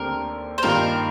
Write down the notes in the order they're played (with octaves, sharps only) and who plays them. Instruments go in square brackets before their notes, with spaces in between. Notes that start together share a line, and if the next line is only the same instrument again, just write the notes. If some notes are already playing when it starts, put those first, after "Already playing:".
Already playing: [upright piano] D#2 D3 A3 C4 G4 [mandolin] A#4
[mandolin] C5
[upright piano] G2 D#3 A#3 F4 [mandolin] A#4